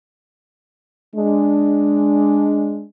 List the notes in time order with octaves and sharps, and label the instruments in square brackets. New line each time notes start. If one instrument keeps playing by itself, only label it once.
[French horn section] G#3 D4